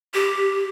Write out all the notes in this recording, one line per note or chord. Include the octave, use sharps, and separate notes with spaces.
G4